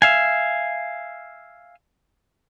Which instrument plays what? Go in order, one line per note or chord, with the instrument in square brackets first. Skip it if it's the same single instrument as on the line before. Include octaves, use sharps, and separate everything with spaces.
[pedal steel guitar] E5 F5 G#5